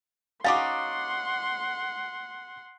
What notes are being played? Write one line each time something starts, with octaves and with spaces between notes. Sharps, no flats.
C#4 D#4 F#4 F5 F#5 C6 D6 A6